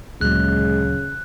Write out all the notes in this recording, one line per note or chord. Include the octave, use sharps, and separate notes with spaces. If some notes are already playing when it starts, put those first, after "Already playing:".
D2 A#2 C#3 F#3 G#3 F#6